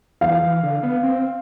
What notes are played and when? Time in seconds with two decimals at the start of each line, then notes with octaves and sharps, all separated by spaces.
0.21 E3 F5
0.43 E3
0.63 D3
0.83 B3
1.03 C4